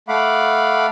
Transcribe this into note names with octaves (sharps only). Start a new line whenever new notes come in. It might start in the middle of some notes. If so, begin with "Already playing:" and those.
A3 F5 F#5 B5 D6